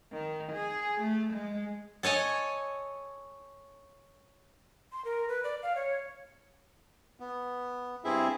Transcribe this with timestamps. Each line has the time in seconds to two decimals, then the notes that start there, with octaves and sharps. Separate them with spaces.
0.12 D#3
0.52 G#4
1.01 A3
1.33 G#3
2.03 A4 C#5 D#5 G#5
4.92 C6
5.05 A#4
5.29 B4
5.44 D5
5.63 F5
5.76 C#5
7.20 B3
8.05 G2 C4 E4 G#4 E5